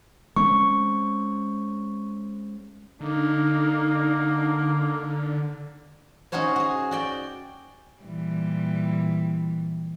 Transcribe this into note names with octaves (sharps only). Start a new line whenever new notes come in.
G#3 C4 C#4 C#6
D3 A#3 D#4
C#4 D#4 F#4 C5 C#5
F#4 G#4
F#4 D5 G5
A#2 E3 G3